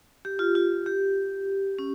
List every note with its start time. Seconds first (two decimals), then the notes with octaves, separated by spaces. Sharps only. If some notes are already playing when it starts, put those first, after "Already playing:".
0.25 G4
0.39 F4
0.55 F4
0.86 G4
1.79 C#4